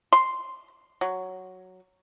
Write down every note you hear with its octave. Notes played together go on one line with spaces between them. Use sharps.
C6
F#3